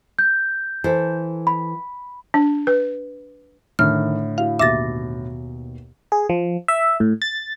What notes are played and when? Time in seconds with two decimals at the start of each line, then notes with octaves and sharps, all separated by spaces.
0.19 G6
0.84 E3 A4 C5
1.47 B5
2.34 D4
2.67 B4
3.79 A2 D3 D#3 F6
4.38 E4 F#4 F5
4.59 D#2 B2 E5 D6 A6 A#6
6.12 G#4
6.29 F3
6.68 E5
7.00 A2
7.22 A6